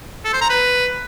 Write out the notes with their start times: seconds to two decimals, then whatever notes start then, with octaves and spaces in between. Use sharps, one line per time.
0.25 A4
0.33 C5
0.42 A#5
0.50 B4